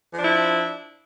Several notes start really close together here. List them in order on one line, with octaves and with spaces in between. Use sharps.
F3 D4 E4